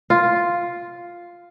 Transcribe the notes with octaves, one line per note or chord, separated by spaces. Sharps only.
F4